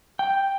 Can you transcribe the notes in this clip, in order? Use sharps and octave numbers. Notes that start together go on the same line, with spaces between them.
G5